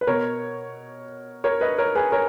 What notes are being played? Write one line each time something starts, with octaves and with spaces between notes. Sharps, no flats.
B4
B2 A#4 C#5
A#4 C#5
B4 D#5
A#4 C#5
G#4 B4
A#4 C#5